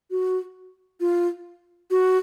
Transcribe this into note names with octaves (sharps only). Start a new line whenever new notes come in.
F#4
F4
F#4